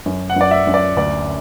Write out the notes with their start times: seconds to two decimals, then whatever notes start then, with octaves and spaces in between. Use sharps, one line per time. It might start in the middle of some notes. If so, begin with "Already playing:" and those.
0.06 F#2
0.30 F#5
0.36 F#2 D5
0.51 E5
0.67 F#2
0.74 D5
0.97 D2 D5